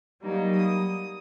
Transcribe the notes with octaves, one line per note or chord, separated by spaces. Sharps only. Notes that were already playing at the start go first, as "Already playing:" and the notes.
F#3 G3 A#3 D#4
D#6